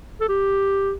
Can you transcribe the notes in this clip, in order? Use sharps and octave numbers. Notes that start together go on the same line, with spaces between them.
A4
G4